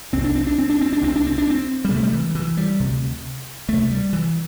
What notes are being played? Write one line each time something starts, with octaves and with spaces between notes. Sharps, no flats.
C2 C3 C4
D4
C4
D4
C4
D4
C4
D4
C2 C3 C4
D4
C4
D4
C4
G3
D2 C3 A3
G3
E3
E3
G3
D2 C3
D2 C3 A3
G3
E3